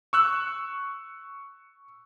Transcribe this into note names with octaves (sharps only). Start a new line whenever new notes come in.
C#6 E6 F#6